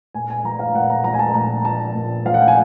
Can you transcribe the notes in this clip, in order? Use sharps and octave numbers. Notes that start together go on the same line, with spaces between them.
A#2 G#5
G#5
F3 A#5
F5
A#2 F#5
A#5
F3 A#5
G#5
A5
A#2 A#5
F3 A5
A#2
F3 F5
F#5
G5
G#5